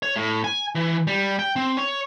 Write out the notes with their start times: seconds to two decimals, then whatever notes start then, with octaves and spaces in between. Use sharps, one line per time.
0.03 C#5
0.16 A2
0.44 G#5
0.75 E3
1.07 G3
1.39 G5
1.56 C4
1.77 C#5